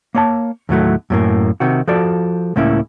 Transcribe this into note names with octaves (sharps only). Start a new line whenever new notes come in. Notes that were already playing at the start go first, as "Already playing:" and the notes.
A#3 C#5 A5
D#2 A2 F#3 A3
F#2 A2 A#3
C3 D#3 F#4
F3 F#4 A4 D5
C#2 A2 A#3 C#4 E4